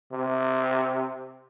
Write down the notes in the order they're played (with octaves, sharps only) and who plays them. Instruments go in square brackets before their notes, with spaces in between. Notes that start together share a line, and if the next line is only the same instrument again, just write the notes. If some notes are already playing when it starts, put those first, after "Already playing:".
[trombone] C3